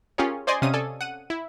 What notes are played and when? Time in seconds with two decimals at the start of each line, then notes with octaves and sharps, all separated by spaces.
0.18 C#4 F4 G4 G#4 A#4 C#5
0.47 C5 D5 D#5 G#5 C6
0.62 C3 C#4 F5 D#6 D#7
0.74 A4 D5 G#5
1.01 F#5 D#7
1.30 E4